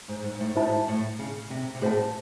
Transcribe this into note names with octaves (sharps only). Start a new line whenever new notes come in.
G#2
G#2
G#2
A2
G#2 E4 C5 E5 A5
A2
C#3
C3
C3
A2 G#4 C5 F#5 A5